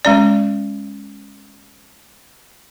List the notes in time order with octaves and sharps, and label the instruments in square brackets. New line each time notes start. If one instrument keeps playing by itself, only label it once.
[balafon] G#3 C#4 D5